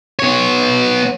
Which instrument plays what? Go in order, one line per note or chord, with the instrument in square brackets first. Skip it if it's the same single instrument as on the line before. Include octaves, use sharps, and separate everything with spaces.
[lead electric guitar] B3 C#5